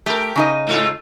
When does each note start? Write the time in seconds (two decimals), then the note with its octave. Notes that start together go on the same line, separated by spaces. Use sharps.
0.06 A3 G4 A#4
0.36 C#3 D#4 D#5
0.67 G#2 A3 F4